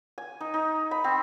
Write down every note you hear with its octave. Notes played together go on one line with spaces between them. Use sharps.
G#5
D#4
D#4
B5
C4